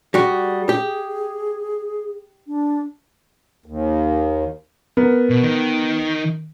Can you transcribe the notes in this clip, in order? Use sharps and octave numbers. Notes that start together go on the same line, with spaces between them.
G3 F#4 G#4
G4
D4
D#2
B3 A#4
B2
D#3